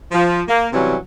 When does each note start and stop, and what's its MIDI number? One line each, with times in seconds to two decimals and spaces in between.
0.11 0.41 53
0.48 0.66 58
0.72 0.95 48
0.72 0.95 52
0.72 0.95 54
0.72 0.95 55
0.72 0.95 61